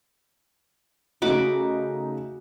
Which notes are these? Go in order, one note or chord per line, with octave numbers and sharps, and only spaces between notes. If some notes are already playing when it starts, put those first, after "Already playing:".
C#3 A3 D#4 F#4 B5 D6